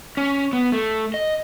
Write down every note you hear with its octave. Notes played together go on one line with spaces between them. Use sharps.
C#4
B3
A3
D#5